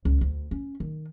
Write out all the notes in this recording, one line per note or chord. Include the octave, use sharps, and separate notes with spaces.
C#2
D2
C#4
D#3